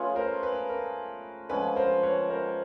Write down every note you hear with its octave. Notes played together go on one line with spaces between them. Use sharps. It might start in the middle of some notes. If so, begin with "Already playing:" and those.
Already playing: A3 C#4 F4 G#4 B4 C#5
A#4 C5
B4
A#4
D3 F3 G#3 C#4 B4
A#4 C5
B4 C#5
A#4 C5